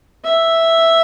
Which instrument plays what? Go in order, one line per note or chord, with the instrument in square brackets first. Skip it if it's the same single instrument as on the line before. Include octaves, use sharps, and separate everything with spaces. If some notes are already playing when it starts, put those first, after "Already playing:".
[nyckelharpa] E5